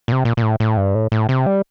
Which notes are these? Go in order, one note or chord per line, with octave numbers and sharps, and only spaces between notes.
A#2
C3
A#2
A#2
A2
A2
G2
A2
A2
C3
G3